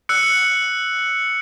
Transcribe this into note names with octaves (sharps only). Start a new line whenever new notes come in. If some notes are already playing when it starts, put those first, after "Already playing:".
E6 F#6 C#7